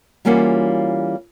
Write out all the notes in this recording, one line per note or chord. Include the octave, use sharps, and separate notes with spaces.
E3 G3 A#3 C#4 F4 F#4